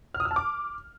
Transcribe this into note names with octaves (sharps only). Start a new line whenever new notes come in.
F6
D#6
E6
A5
D6